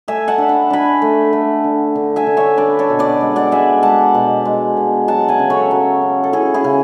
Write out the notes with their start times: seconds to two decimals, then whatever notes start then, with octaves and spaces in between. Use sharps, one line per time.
0.08 A3 E5 G#5
0.28 F#5 A5
0.38 D4
0.49 B5
0.70 D4 G#5 B5
1.02 A3
1.33 A3
1.64 D3
1.95 D3
2.16 E5 G#5
2.27 D3
2.37 C#5 E5
2.57 D4 B4 D5
2.79 A4 C#5
2.90 B2
2.99 B4 D5
3.21 G#3
3.36 D5 F#5
3.52 G#3 E5 G#5
3.83 G#3 F#5 A5
4.15 B2
4.45 G#3
4.77 B3
5.08 F#3 F#5 A5
5.28 E5 G#5
5.39 C#3
5.50 A4 C#5
5.71 F#3
6.02 C#4
6.24 A4
6.33 C#3 E4 G#4
6.54 E4 G#4
6.64 C#3